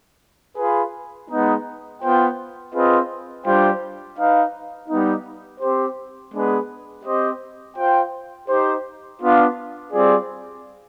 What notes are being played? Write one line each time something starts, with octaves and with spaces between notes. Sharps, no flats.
F4 G#4 B4
G#3 B3 D#4
B3 F4 C5 G5
C4 F4 G#4 B4 D#5
G3 D4 F4 C5 G5
D#4 B4 F5
G3 B3 D#4
C4 G4 C5
G#3 B3 D4 G#4 B4
C4 G4 C5 D#5
F4 C5 G5
D#4 G4 C5
B3 D4 F4
G3 C4 F4 G#4 D5